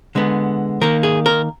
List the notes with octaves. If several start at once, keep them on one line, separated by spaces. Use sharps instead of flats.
D3 G#3 B3
D#3 A#3 A#4
G#4
A#4